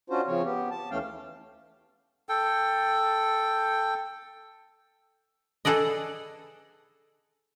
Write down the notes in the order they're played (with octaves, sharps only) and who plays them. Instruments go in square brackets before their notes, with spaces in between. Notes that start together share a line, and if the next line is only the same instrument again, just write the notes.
[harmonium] C#4 D4 F4 F#4 C5
C#3 F3 C4 C#5
B3 G4
A5
D#2 E3 A3 C#4 F5 G5
[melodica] A4 G5
[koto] G#4 A4 B4 D5 D#5